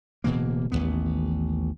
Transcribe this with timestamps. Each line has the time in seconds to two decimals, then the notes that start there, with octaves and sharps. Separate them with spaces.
0.24 D1 B2 E3 A#3
0.72 A1 D#2 B2 B3